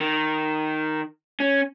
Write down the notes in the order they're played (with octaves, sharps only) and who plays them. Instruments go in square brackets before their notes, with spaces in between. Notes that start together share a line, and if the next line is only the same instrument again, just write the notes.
[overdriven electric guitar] D#3
C#4